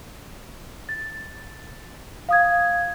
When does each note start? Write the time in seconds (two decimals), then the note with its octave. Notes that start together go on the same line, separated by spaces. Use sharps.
0.89 A6
2.29 F5 D#6 G#6